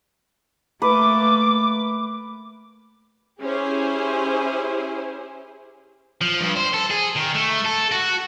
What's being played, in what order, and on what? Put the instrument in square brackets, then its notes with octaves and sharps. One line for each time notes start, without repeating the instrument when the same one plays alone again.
[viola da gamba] A3 A#3 [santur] B4 [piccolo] D6
[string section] C#4 E4 G4 G#4 C5
[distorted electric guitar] F3
G2
C5
A4
G#4
D#3
A3
A4
F#4